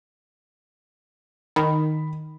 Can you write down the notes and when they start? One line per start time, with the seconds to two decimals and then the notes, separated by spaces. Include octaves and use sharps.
1.56 D#3 B5